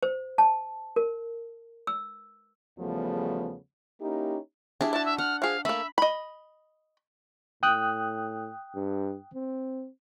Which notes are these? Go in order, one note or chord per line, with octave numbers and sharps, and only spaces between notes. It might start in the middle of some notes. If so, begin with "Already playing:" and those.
C5
A5
A#4
E6
E2 C#3 F3 G3 A3 B3
A#3 C#4 D#4 E4 G4
G3 D4 E4 G#4
E4 F#4 A5
E5
F#5 F6
F3 G#4 F5
A3 A#3 E5 B5
D#5 B5
A2 G5 D#6 F#6
G2
C4